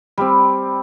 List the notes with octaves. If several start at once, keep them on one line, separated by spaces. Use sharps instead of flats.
G3 C4